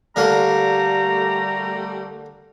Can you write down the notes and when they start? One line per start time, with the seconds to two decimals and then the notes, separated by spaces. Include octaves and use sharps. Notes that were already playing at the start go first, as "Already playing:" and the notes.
0.16 D3 G3 A3 A#3 A#4 A#5